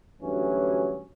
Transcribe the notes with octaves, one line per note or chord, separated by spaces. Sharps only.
D2 G2 E3 F#3 C#4